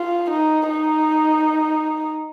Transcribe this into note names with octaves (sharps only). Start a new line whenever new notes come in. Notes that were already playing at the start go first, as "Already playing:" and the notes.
Already playing: F4
D#4
D#4